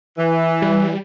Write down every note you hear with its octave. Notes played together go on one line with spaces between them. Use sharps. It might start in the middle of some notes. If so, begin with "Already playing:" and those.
E3
G3